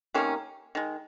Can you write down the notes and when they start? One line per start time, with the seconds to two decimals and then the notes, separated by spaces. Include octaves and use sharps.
0.14 C3 D#3 A#3 C#4
0.75 D#3 G#3